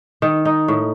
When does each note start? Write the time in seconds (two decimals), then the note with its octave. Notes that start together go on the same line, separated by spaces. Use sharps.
0.22 D#3
0.45 D#4
0.68 A2